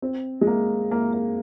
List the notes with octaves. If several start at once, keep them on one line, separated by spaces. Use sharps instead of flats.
C4
G#3
A#3
A#3
A#3